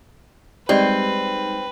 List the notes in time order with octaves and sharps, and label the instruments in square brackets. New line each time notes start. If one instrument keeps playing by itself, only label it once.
[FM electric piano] G3 G#3 D#4 [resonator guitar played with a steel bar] C4 [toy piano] G4 D5 D#5 [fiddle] B4